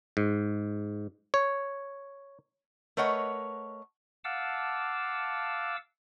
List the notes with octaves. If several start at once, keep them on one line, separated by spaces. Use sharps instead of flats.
G#2
C#5
A3 A#4 B4 C#5 D#5 F#5
F5 F#5 A5 D6 E6